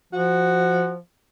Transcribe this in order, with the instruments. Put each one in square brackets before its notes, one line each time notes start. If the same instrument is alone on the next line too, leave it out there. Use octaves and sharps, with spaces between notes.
[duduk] F3 [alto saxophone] F#4